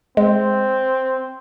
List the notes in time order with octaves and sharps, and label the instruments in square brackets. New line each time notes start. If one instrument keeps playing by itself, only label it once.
[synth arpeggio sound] G#3 [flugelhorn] C4